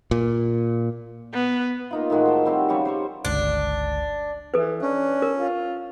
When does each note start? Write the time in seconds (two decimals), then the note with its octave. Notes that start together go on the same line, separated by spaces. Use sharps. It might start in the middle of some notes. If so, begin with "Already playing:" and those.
0.11 A#2
1.33 B3
1.91 A#3 D#4 F4
2.10 A2 D#3 G#3 F#4
2.26 C5 G5 A5
2.45 G3 C4 F#4 C#5
2.69 C#3 G3 C#5 C#6
2.85 C5 C#5 C#6
3.25 G1 C#2 D4
4.54 E3 A4 B4
4.82 C#4 D4
5.22 A#4
5.36 F4